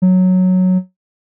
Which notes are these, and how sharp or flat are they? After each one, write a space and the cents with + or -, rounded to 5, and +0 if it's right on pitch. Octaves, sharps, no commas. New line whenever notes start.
F#3 -5